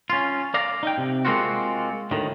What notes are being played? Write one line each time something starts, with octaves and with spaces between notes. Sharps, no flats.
C#4 F4
D5 F5 A#5
D#4 G5
C3
G#3 A#3 C4 F4 F#4
D2 A2 D#3